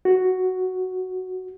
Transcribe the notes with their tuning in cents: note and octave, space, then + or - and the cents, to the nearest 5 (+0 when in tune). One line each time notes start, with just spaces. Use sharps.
F#4 +5